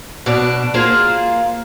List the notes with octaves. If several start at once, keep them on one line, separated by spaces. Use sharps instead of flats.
B2 D4
A#3 F4 G#4 C5